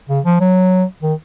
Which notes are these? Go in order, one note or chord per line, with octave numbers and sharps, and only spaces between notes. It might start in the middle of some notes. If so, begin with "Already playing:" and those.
C#3
F3
F#3
D#3